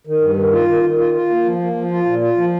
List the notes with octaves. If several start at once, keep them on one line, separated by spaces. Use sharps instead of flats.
D#3
G2
D#3
F4
D#3
D#3
F4
F4
A#3
F3
A#3
F3
F4
A#2
F4
F3